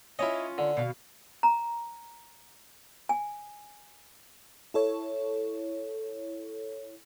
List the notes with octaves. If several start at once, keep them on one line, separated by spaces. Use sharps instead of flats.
C#4 E4 F4 C#5 D#5
D3
B2 F5
A#5
G#5
E4 A4 C#5